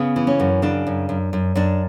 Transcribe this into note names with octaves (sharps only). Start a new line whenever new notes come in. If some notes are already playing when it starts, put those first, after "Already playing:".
Already playing: C#3 B3
E3
C#4
F#2
C#3 D4
F#2
F#2
F#2
F#2 D4